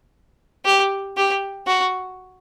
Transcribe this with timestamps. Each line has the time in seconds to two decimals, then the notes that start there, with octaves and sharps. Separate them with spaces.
0.65 G4
1.17 G4
1.67 F#4